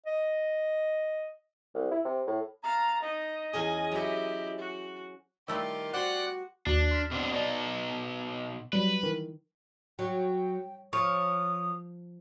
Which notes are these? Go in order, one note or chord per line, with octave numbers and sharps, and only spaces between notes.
D#5
C2
E4
C3
A2
F5 A5 A#5
D#4 D#5
E2 C#4 G#4 G#5
F#3 E4 G4 C#5
F#4
D#3 G3 A3 E4 F4 G4
F#4 C5 D5 F#5 F#6
D#2 D4 F#4 F#6
C6 F6 B6
B2 C4 D4
B2 D#4 D5 G#6 A6
F#3 G3 B4
D#3 E3
F#3 G5
F3 C#5 D#6